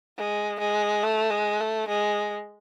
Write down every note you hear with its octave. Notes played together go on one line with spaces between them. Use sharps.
G#3
G#3
A3
G#3
A3
G#3